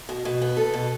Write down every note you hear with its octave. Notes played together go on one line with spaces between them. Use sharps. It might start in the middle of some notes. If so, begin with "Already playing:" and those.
B2
B2
B3
A4
B2